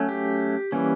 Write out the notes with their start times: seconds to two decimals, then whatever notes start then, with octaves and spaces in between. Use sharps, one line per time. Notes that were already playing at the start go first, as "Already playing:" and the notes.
Already playing: F#3 A3 C#4
0.09 G4
0.72 E3 G3 A#3 C#4